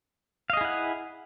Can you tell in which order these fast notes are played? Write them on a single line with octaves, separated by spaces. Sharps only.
F5 D#5 G#4 E4 F#5